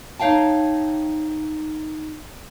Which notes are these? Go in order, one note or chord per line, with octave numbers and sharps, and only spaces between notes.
D#4 C#5 F5 G5 A5